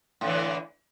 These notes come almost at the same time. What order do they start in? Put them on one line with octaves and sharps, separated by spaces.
A2 D3 E3